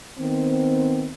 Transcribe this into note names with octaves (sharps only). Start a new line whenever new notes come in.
D#3 B3 C4